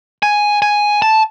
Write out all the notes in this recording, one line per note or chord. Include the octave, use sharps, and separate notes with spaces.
G#5
G#5
A5